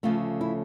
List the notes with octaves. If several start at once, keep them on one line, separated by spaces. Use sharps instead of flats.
D2 C#3 F3 A3 F4
E4